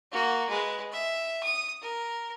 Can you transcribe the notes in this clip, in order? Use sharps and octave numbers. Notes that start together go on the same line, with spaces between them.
A#3 F#4
G#3 B4
E5
D#6
A#4